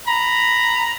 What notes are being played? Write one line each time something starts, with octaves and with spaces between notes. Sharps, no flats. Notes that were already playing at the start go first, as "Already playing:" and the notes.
A#5 B5